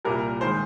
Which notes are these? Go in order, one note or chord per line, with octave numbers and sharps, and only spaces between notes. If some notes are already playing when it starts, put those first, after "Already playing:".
C2 A#2 G3 A#4
D#3 G#3 C5